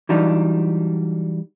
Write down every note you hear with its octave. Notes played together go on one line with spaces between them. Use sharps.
E3 F#3 G3 D4 D#4 F4